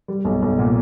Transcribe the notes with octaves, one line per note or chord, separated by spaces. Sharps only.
G3
B1
B1
A#2